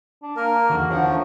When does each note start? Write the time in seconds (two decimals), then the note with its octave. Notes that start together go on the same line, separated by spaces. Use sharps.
0.23 D4
0.37 A#3 A#4
0.70 E2 D3 D#3 F#4
0.90 F3 D4 C#5 F#5
1.07 A3